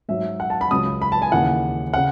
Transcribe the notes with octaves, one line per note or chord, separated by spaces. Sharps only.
G#2 F#3 E5
F#5
A5
B5
C#2 C#3 F#3 D#6
B5
A5
G#5
D#2 C#3 E3 F#5
C#3 F#5